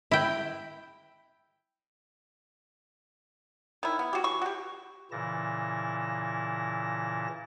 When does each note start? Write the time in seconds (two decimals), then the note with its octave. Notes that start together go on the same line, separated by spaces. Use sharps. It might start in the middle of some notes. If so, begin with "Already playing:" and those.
0.11 E4 G5
3.83 D#3 E4
3.99 B3
4.13 F#4 G4
4.24 E3 C#6
4.42 F#4 G4
5.11 A#2 C#3 E3 E4 A5 A#6